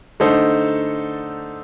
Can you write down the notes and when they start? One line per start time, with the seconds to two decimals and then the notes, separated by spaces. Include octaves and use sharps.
0.20 D3 A3 D#4 A4 C5